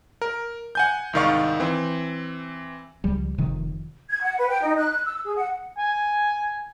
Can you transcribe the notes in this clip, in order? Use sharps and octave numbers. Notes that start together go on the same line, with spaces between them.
A#4
F#5 G#5 G6
C2 G#2 D#3 D5 F5 C#6
E3 C4
C#2 F3 G3
F1 C3 D#3 F3
G#6
F#5
B4
G5
D#4
F#6
F#6
E6
G#4
F#5
G#5